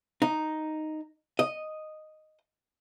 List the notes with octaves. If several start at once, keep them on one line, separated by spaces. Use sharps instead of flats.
D#4
D#5